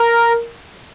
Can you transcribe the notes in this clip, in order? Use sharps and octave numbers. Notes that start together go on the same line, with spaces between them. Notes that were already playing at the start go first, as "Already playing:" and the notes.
Already playing: A#4